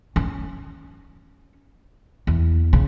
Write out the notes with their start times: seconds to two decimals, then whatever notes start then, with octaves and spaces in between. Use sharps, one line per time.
0.16 C#4
2.27 E2
2.73 C#3